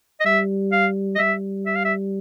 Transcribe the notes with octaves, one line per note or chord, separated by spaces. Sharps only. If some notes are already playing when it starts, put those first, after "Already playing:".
D#5
G3 E5
F5
D#5
G3 E5
E5
F5
E5